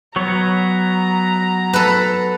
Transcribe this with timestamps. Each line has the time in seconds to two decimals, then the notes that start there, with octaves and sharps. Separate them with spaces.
0.16 F#3 B3 C#5 A#5
1.73 A4 B4